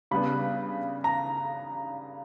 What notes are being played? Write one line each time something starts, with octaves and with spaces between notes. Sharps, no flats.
C#3 G3 B3 D4 B5
A#5